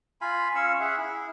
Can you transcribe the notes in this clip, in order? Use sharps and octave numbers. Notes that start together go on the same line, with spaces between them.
F4 F5 G#5 B5
C#4 C#5 F5 E6
G#4 E5 F#5
E4